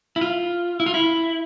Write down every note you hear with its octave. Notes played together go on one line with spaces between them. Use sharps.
E4
F4
E4
F4
E4